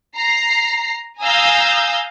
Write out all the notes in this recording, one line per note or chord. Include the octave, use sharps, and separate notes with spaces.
A#5 C7
F5 G#5 A#5 D#6 E6 G6